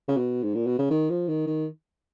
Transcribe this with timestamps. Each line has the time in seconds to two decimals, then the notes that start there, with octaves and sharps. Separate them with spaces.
0.08 C#3
0.17 B2
0.43 G#2
0.55 A#2
0.67 B2
0.79 C#3
0.90 D#3
1.10 F3
1.28 D#3
1.47 D#3